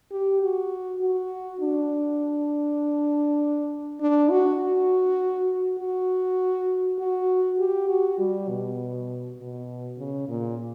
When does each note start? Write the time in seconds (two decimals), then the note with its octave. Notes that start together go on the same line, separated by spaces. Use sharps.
0.11 G4
0.42 F#4
1.01 F#4
1.61 D4
4.00 D4
4.30 F#4
5.79 F#4
6.98 F#4
7.59 G4
7.88 F#4
8.19 G3
8.49 B2
9.38 B2
9.98 C#3
10.28 A#2